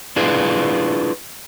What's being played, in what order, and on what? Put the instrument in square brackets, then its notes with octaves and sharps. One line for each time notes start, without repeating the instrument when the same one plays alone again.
[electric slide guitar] D4 E4 F4 G#4 B4